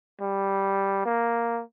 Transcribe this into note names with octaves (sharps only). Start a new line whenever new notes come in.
G3
A#3